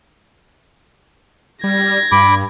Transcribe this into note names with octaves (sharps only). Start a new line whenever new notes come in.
G3 G#6 A#6
G2 B5 D6